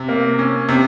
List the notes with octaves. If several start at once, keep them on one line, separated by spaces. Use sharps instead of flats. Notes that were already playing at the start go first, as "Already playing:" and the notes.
Already playing: C3
A#3
C#4
C3